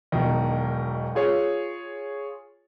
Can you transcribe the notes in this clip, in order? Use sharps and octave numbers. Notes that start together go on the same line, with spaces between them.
E1 B1 D#3
F4 G#4 C#5